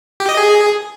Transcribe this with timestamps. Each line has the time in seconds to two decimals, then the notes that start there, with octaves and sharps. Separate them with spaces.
0.20 G4
0.29 D#5
0.37 G#4